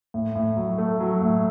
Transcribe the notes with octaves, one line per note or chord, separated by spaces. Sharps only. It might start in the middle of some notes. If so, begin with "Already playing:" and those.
A2
A2
F#3
A3
F#3
A2